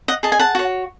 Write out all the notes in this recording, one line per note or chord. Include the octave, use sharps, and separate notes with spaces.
D#5 F#5
G#4 D#5 A5
G#5
F#5 A5
F#4 C#5